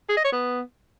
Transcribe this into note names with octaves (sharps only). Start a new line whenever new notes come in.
G#4
D#5
C#5
B3